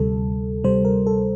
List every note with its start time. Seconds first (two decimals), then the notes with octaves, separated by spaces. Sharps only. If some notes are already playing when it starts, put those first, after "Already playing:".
Already playing: D2 C3 G3 A4
0.64 D2 C3 G3 C5
0.85 A#4
1.07 A4